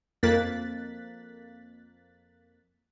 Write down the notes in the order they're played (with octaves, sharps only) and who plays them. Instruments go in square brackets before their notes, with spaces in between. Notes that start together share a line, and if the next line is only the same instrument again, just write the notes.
[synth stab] F2 A#3 F#6 A6 B6